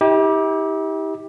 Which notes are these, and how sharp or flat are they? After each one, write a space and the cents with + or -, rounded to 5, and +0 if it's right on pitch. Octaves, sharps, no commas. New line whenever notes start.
E4 -45 G4 +10